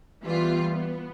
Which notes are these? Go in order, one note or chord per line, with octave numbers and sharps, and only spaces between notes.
E3 G3 B3 F4
B3